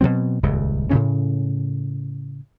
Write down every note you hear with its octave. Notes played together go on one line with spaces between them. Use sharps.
B2 D3 F#3 C4
D#1 C#2 G2 C#3
A2 C#3 C#4